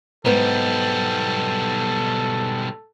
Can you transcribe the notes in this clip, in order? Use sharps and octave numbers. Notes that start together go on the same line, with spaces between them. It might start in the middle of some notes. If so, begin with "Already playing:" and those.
B1 G#2 G3 B3 A4